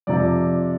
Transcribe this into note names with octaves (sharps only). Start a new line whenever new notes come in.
F2 C3 F3 D5